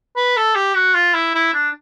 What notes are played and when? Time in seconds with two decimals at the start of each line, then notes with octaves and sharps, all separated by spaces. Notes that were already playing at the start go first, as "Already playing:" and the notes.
0.16 B4
0.37 A4
0.55 G4
0.75 F#4
0.95 F4
1.14 E4
1.35 E4
1.54 D4